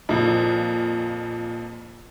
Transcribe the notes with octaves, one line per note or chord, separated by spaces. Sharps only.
F2 A#2